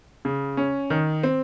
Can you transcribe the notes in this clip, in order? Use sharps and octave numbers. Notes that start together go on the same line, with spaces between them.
C#3
C#4
D#3
C4